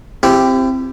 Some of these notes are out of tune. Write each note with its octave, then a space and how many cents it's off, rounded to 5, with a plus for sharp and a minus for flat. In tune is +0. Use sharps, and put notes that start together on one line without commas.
C4 +0 E4 +40 G4 +0